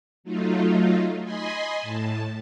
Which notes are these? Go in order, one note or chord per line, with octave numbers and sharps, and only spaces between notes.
F#3 A3 D#4 F4
D#5 G#5 B5 C6
A2 A5